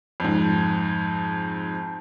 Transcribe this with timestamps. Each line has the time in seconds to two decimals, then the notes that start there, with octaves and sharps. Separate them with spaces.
0.20 F2 G#2